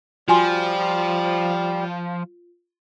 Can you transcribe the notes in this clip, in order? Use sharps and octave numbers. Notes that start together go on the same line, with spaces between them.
F3 G3 F4 F#4 G#5 C6